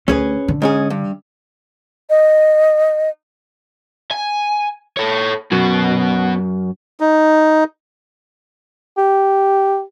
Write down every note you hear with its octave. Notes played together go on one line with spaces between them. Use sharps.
D2 C#4 G#4 B4
D3
G#2 C#4 G#4
G2
D#5
G#5
A4 C#5
F#2 B2 F#4
D#4
G4